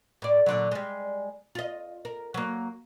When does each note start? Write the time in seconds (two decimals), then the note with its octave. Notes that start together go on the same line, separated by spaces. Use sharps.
0.22 A2 D5
0.46 A#2 D3 F#3
0.71 G3 G#3
1.55 F4 D#5
2.05 A#4
2.34 F#3 A#3